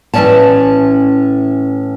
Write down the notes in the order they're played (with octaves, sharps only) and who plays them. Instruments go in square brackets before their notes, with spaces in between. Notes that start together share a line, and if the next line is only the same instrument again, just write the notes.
[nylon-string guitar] A2 E3 F#3 C#4 D5 A5